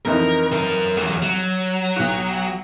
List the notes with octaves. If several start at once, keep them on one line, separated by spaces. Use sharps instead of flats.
F2 E3 D#4 A#4
F#3 A#4
E2 F#3
F#3
B1 F#4